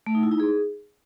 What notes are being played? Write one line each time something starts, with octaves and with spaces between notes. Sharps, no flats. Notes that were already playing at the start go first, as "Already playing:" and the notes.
A3
D#4
E4
D#4
G#4